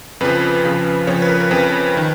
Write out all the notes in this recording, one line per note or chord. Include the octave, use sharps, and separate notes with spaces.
F2 C#3 F3 B4
F2 C#3 F3
F2 C#3 F3 C#5
B4
A#4
A#4
F2 C#3 F3 B4
D#3